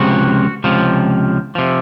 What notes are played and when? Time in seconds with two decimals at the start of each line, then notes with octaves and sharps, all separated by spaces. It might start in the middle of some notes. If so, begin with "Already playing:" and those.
Already playing: C#2 C3 F3 F#4
0.64 C#2 C3 F3
1.55 C3 F3